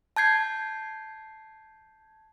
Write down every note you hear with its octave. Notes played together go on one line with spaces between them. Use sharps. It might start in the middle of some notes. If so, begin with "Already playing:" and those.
A5 G6 G#6 C7